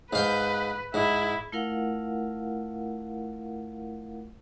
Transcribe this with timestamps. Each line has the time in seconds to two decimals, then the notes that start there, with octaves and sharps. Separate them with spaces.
0.13 G#2 B4 F5 G5
0.94 G#2 E4
1.52 A3 E4 F4 A#4 F5 F#5